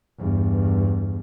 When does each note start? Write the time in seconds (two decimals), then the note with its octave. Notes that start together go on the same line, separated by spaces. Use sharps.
0.20 E2 G2